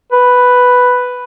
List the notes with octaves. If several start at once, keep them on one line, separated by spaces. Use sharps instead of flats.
B4